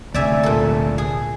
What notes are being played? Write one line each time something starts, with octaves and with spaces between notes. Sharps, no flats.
D2 C3 D5 E5 G#5
A#2 A4
G#4